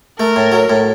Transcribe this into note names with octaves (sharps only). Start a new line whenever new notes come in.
A3 A#4
A2
F#3
A2